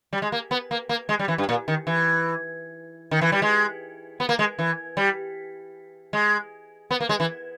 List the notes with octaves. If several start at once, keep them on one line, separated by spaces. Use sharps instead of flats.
G3
G#3
A#3
B3
A#3
A#3
G#3
G3
E3
G2
A#2
D#3
E3
D#3
E3
G3
G#3
B3
A#3
G#3
E3
G3
G#3
B3
A#3
G#3
E3